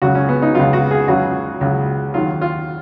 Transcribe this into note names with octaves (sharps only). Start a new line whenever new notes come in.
C#2 C#3 F#3 F#4
C#4
B3
D#4
C#2 C#3 F#3 F4
F#4
G#4
C#2 C#3 F#3 F#4
C#2 C#3 F#3
D#2 D#3 F#3 F4
F4